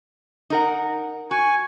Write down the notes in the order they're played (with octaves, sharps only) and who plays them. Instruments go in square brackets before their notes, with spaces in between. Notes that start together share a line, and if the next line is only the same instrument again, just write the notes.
[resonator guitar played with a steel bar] D#4 A#4 F#5
[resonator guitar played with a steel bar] F#4 [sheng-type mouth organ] G#5 C#6